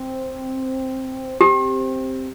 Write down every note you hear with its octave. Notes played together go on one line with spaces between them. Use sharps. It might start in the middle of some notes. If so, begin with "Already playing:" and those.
Already playing: C4
C4 G4